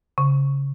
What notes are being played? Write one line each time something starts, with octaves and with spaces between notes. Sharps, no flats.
C#3